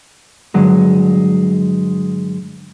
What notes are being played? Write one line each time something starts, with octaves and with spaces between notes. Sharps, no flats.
G2 D3 F#3 G#3